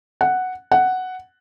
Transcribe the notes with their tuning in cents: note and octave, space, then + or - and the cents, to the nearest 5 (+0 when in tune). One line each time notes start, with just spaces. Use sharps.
F#5 +0
F#5 +5